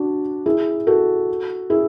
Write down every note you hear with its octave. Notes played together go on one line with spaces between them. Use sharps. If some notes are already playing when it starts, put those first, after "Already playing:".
Already playing: D4 F#4
E4 G#4
F#4 A4
E4 G#4